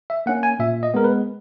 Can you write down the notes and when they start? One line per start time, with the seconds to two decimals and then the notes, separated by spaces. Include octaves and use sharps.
0.10 E5
0.26 A#3 C#4 F#5
0.43 G#5
0.59 A#2 E5
0.83 D#5
0.94 G#3 B3 A#4
1.04 B4